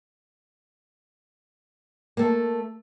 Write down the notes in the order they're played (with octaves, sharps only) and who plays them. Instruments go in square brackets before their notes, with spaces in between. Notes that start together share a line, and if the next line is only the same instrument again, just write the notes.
[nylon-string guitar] A3 A#3